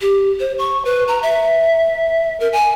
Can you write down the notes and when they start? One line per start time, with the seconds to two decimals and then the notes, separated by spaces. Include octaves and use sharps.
0.01 G4
0.40 C5
0.58 C#6
0.85 B4
1.08 A#5
1.23 E5
2.40 A#4
2.53 G#5